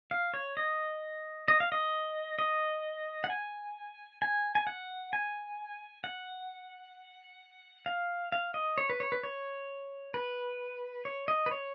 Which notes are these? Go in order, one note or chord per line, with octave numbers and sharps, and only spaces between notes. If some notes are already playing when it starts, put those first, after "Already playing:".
F5
C#5
D#5
D#5
F5
D#5
D#5
F#5
G#5
G#5
G#5
F#5
G#5
F#5
F5
F5
D#5
C#5
B4
C#5
B4
C#5
B4
C#5
D#5
B4
C#5